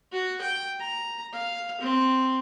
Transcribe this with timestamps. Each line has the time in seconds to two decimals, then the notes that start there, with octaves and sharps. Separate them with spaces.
0.13 F#4
0.41 G5
0.80 A#5
1.33 F5
1.81 C4